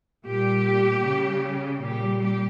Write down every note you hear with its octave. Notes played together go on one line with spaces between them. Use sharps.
A#2 G3 G4
C#3 G3
A#2 G3 G4
G4